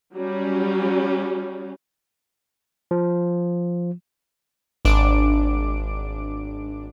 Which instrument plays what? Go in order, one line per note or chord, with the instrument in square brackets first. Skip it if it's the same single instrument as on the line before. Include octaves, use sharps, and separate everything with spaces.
[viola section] F#3 G3 C#4
[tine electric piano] F3
[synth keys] G#1 D4 D6 D7